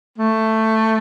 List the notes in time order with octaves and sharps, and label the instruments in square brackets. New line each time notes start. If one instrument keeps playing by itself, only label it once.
[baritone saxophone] A3